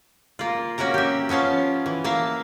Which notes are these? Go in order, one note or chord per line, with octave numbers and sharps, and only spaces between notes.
A#3 F4
A#3 C#4 F#4 A#4 A#5
G4 E5
F3 B3 C#4 F5 A5
E3
A#3 E5 F5 A5